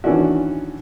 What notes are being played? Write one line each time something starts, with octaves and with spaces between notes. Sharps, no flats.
D#3 E3 C#4 D4 F#4